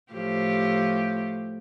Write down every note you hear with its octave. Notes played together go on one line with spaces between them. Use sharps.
A2 F3 G4